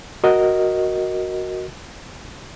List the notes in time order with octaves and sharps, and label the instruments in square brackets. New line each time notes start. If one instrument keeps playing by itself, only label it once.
[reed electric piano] F#4 A#4 D#5